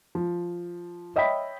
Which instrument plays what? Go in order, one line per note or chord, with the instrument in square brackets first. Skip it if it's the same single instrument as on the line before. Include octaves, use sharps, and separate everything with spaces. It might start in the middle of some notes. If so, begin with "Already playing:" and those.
[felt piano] F3
C#5 D#5 E5 G5 B5 B6